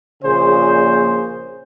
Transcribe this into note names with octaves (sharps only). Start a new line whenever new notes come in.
A#1 A#2 C#3 G#4 C5